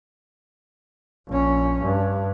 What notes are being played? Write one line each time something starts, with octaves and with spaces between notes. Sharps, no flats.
A#1 C#4
G2